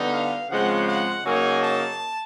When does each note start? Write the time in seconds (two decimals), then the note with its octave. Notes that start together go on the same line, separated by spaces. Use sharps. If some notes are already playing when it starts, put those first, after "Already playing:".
Already playing: D3 G3 B3 D#4
0.12 F5
0.49 C#3 F3 G#3 C4 F#5
0.86 F#5
1.23 C#3 F#3 A#3 D#4 G#5
1.60 A5